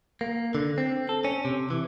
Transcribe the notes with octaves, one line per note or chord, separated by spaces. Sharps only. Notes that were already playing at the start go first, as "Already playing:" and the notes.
A#3
D3
C4
A4
C#4
C3
E3